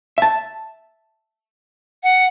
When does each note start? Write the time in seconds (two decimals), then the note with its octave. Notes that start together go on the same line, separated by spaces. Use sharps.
0.18 E5 A5
2.03 F#5